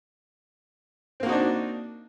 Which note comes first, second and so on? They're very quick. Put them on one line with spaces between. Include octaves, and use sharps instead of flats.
C4 A#3 F#4 D#4 D4